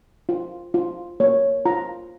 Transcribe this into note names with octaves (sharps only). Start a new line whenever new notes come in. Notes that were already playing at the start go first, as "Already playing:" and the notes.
F4
F4
A#3 C#5
F4 A#5